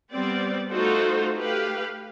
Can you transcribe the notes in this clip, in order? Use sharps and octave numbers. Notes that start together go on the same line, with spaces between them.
G3 B3 C4 D5
A3 D#4 F4 F#4 A4 C5
A3 G4 B4 F5